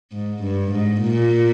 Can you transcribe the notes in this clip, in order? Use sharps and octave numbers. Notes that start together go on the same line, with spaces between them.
G#2
G2
G#2
A#2